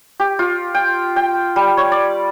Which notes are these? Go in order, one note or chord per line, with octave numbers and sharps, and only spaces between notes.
G4
F4
G5
G5
G3
C#5
D5